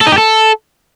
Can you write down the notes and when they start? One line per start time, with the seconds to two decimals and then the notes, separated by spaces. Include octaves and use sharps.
0.01 A4
0.07 D#4
0.12 G4
0.18 A4